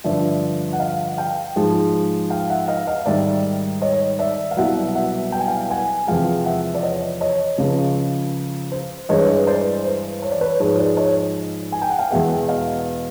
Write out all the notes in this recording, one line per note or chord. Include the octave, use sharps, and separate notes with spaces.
G2 D3 F3 D5 E5
F#5
D#5 F5
F5 G5
G#2 F3 G#3
F5 G5
E5 F#5
D#5 F5
D#5 F5
G#2 D#3 G3 D5 E5
C#5 D#5
D5 E5
F5
C2 B2 F#3 E5 F#5
E5 F#5
G5
G#5
F5 G5
F#5 G#5
E2 C3 F3 G#3 F5 G5
E5 F#5
D5
C#5 D#5
C#5 D#5
C#2 C#3 F3
C5
G2 E3 G#3 C#5 D#5
C5 D5
C5
C#5
D5
B4 C#5
G#2 F3 G#3 B4 C#5
C5 D5
C#5 D#5
G#5
G5
F#5
F5 G5
E2 B2 G#3 E5 F#5
D#5 F5